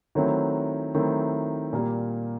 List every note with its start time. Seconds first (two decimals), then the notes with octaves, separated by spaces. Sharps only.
0.15 D#3 F#3 A3 C4 E4
0.94 D#3 F#3 A3 C4 E4
1.73 A#2 G3 A#3